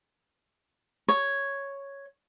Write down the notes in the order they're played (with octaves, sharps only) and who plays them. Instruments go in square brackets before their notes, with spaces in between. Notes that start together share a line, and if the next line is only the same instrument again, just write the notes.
[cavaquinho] C#5